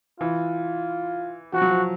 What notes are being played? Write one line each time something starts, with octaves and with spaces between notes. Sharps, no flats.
E3 F4
F3 F#4
F#3
F3